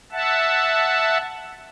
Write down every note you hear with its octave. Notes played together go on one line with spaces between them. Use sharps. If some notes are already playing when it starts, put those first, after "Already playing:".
E5 F#5 A5